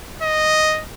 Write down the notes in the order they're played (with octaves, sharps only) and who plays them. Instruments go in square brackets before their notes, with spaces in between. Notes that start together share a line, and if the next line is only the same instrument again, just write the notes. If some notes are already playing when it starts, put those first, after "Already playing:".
[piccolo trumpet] D#5